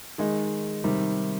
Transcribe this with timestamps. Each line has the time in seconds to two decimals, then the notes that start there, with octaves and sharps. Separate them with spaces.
0.18 D#3 G#3 D#4 G#4
0.84 C3 D#3 G3